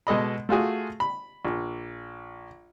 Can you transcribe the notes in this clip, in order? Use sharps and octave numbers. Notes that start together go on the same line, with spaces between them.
B2 G#3 A4 D#5 B5
A3 F4 F#4 G#4
B5
A#1